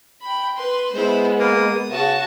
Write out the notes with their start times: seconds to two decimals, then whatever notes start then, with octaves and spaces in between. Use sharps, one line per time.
0.22 G5 B5
0.57 B4 C6
0.93 G#3 B3 E4 C5
1.40 A#3 D#6
1.91 C#3 F#4 A5